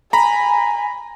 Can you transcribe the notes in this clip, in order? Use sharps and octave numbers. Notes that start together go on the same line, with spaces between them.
G#5 A#5 B5